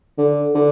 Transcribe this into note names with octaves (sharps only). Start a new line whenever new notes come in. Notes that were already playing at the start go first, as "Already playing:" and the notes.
D3
D3